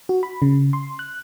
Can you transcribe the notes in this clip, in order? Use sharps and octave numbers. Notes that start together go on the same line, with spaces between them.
F#4
B5
C#3
C6
F#6